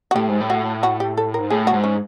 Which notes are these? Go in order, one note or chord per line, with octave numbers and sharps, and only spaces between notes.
F#4
A2 G4
G#2
A2
F#4
F#4
G4
A4
G#2 A#4
A2 G#4
F#4
G#2
C#4